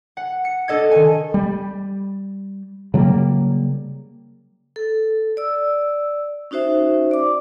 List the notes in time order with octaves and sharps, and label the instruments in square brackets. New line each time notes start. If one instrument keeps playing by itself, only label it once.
[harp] F#5
C#7
D4 A4 D#5 G#6
D#3 G#5
[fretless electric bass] G3
C#3 F#3 G3 A#3
[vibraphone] A4
D5 E6
C#4 D#4 F#4 C5 E5
D5 D6